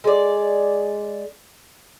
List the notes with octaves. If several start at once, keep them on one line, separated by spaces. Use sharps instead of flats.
G#3 D5